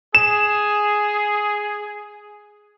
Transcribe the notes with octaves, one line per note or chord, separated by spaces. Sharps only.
G#4 E7